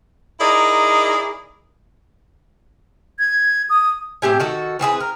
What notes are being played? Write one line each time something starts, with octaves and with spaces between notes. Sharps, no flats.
D#4 E4 G#4 A#4 D5 D#5
G#6
D#6
A2 C4 G4 G#5
D#3 F#4 A4
E3 C4 G#4 B4
A#4